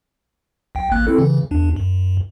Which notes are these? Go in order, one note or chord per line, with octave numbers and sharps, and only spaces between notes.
B1 G5
A1 A#3 F#6
C4 E4 A4
C#3 E3
E2 D4
F#2